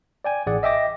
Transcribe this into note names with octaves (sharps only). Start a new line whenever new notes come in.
D5 G5 G#5
A1 G#4 D5 F#5
D#5 E5 G5 D6 A#6